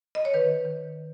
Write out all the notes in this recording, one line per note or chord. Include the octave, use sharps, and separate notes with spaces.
D#5
C#5
D#3 B4
D#3